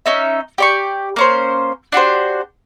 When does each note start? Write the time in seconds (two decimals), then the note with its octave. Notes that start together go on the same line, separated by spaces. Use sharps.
0.06 C#4 D#4 E5
0.58 G4 D5 C#6
1.16 A#3 C#4 C5
1.92 D4 F#4 G4 C5